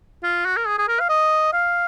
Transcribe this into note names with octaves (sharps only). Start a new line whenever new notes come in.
F4
F#4
A#4
G#4
G#4
A#4
F5
D#5
F5